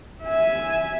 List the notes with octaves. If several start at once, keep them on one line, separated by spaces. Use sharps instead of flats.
E5 G#5